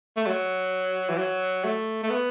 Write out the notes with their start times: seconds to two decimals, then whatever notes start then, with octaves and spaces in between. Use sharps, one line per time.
0.16 A3
0.26 F#3
1.09 E3
1.18 F#3
1.64 A3
2.03 A3
2.10 B3